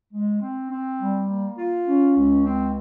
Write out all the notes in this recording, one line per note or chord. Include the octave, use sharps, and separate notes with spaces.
G#3
C4
C4
G3
A#3
F4
C#4
C#2
C4